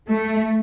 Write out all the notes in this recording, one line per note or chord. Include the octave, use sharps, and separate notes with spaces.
A3